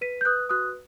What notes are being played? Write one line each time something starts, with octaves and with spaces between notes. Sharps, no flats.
B4 B6 D#7
G6
B4 D#6 F#6
F#4 D#6 F#6